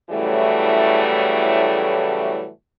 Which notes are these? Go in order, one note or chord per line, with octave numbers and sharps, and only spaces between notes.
A2 C#3 E3 F#3 G3 A3